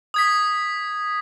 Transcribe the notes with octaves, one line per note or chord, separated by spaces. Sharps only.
D#6 G#6 B6